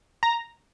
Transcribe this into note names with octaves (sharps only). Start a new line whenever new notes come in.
A#5